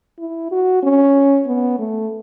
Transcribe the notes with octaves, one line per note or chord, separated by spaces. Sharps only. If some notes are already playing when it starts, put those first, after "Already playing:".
E4
F#4
C#4
B3
A3